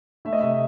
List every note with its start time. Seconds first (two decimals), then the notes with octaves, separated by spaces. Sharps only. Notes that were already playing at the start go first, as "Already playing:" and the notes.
0.25 A3 E5
0.33 D#5
0.41 C3 E5